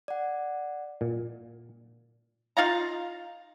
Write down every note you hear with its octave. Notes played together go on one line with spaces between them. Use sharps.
D5 F#5
A#2
D#4 F4 F5 A#5